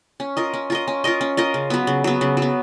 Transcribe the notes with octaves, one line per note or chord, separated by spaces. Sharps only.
C#4
F4 A#4 D#5
C#4
F4 A#4 D#5
C#4
F4 A#4 D#5
C#4
F4 A#4 D#5
C#3
F#3 B3
C#3
F#3 B3
C#3
F#3
B3